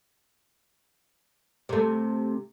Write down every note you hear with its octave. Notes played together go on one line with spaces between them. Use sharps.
C3 A3